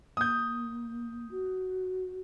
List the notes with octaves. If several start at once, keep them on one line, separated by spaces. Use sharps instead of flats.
A#3 D#6 G6
F#4